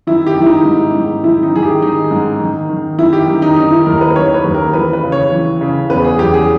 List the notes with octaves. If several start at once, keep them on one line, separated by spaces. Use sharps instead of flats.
D#3 E4
G4
D#3
E4
D#4
G#2
G#2
D#3 E4
D#4
D#3 G#4
G4
D#3 D#4
G#2
D#3
D#3
D#3 E4
G4
D#3
D#4
D#3 D#4
E4
D#2 A#4
B4
D#3 C#5
B4
D#2
A#4
E3 B4
B4
C#3
C#5
E3
C#3
E2 B4
G#4
E2 G4
G#4